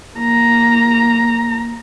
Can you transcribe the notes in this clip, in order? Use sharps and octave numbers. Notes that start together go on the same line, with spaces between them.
A#3 A#5